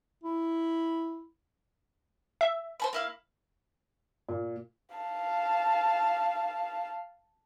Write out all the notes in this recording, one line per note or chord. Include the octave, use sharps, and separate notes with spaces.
E4
E5
C5 A5 B5
A#3 E4 F5
A#2
F5 A5